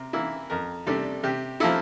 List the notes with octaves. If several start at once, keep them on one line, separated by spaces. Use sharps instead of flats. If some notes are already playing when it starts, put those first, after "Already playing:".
Already playing: C3 A#4
E3 A#3 E4
F2 A#4
C3 G3 D4 A4
C3 G4
F3 A#3 E4 A4